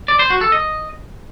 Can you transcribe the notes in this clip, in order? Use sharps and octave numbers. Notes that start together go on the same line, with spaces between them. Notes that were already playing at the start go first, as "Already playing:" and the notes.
D5
C5
F#4
A4
D#5